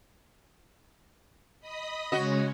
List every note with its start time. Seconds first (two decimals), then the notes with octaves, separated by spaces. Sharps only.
1.61 D#5 B5 D#6
2.12 C#3 G#3 F#4 C#5 D#5